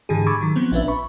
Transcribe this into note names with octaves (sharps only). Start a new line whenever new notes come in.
G#2 D3 E3 G4 G#4
B5 C#6 D6 E6 G#6 A6
D#3 F#3
F3 B3 C4
A#1 C#4 D4 B4 E5
B5 C#6